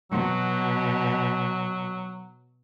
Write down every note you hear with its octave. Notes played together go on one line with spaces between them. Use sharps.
B2 F#3